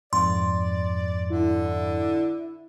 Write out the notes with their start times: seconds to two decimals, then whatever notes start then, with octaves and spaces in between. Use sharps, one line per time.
0.13 F2 G#2 D5 C6
1.30 D3 E4